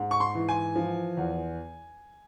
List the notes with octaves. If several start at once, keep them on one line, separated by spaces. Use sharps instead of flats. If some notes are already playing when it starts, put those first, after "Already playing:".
Already playing: G#2
C#6
C6
E3
G#5
F3
E2